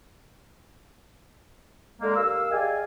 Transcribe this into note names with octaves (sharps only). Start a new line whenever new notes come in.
D3 G#3 A#3
D#2 F5 E6
G4 G#4 D5 D#5 F5 G#5